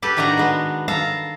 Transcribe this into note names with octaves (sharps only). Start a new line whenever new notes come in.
G4 A4 B4
A2 D#3 D4 F#4 F#5 A#5
G#3 B3
A4 F5 A#5